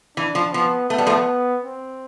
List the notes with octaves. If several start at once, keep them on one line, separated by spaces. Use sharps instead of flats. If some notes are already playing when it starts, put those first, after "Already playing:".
E3 D4
F3
F3 B3
A3 B3
G3
F3 A3
C4